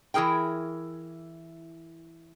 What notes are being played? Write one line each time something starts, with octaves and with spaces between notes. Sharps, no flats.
E3 E4 G#4 A#4 G5